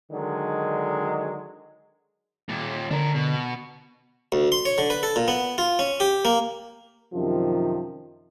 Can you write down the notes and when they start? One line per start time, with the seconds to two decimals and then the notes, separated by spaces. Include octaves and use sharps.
0.11 D3 D#3 F#3 G#3
2.49 D#2 A#2
2.91 D3 D4 A#4
3.15 B2
4.32 D2
4.52 C6
4.65 C#5
4.78 D3
4.90 B4
5.03 A4
5.16 A#2
5.28 B3
5.58 F4
5.79 C#4
6.00 G4
6.25 A#3
7.14 F#2 C3 D#3 F3